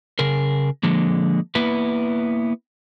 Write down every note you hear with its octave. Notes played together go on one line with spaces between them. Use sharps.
C#3 G#4 A#4
D3 F3 G#3 A#3
A#3 B3 E4 B4